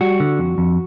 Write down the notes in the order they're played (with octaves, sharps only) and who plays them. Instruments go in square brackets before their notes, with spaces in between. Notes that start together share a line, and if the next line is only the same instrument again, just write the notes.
[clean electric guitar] G3 F#4
D3
F2
F2